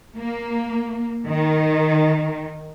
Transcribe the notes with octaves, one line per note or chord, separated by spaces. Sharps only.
A#3
D#3